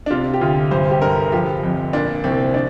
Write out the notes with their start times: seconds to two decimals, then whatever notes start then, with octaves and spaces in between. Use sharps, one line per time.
0.06 D4
0.10 C3 F4
0.34 G4
0.41 D2 F4
0.71 G2 C5
0.91 G4
1.01 G1 A#4
1.32 F3 G4
1.63 F2
1.93 A#2 D4
2.24 C2 C4
2.54 D4